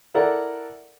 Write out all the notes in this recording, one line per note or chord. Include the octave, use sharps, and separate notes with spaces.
E4 A4 A#4 D5 F#5